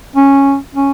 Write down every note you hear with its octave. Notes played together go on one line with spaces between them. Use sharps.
C#4
C#4